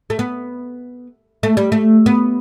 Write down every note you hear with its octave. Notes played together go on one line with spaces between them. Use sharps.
A3
B3
A3
G3
A3
B3